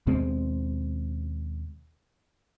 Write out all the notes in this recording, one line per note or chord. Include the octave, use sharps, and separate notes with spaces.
D#2 B2 G#3 C4